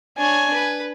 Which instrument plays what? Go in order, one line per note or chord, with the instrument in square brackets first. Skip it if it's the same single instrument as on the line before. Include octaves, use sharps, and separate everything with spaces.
[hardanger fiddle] D4 C#5 [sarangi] G#5
[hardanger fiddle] B4